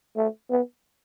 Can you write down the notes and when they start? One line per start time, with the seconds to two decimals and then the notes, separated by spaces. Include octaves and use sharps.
0.17 A3
0.50 B3